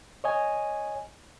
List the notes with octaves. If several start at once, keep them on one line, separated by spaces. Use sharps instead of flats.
C#5 D#5 G#5